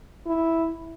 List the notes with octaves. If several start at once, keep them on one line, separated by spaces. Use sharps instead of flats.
E4